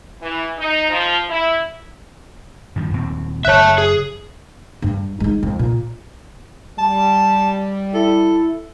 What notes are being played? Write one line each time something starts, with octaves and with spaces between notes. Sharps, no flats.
E3
D#4
F3
E4
G2 D#3 F3
D#1 D#2 C4
F#1 C#5 E5 A5 F#6
G#4
G2
G#3 D#4
F2
A#2
G3 A5
E4 A4